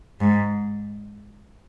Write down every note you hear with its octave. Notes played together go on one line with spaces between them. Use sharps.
G#2